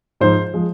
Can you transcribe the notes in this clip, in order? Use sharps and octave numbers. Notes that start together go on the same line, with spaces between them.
G#2 F3 G#3 C5
F3 G#3